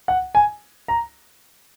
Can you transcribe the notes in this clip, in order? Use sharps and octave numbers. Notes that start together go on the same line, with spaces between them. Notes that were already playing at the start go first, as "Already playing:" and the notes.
F#5
G#5
A#5